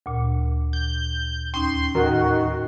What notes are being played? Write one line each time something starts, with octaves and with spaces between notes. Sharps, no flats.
D2 A#2
G6
D#2 C#4 D#4 C6
A2 D#3 F#4